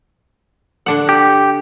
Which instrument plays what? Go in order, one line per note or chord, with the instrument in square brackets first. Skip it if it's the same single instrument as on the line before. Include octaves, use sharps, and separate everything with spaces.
[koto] D3 D4 F#5
[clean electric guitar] G4